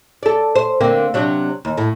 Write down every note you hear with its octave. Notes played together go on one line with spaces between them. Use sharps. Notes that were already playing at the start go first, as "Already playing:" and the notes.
A4 D5
C5
D3 A#3 C4
C3 F#3 D4
D#2
A2